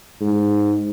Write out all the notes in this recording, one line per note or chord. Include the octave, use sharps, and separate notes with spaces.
G#2